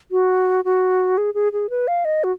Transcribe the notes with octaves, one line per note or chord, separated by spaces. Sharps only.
F#4
F#4
G#4
G#4
G#4
B4
F5
D#5
F#4